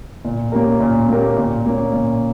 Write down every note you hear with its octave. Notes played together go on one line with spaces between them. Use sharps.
A#2
A#3 C#4 G4 A#4
A#2
A#3 C#4 G4 A#4
A#2
A#3 C#4
A#2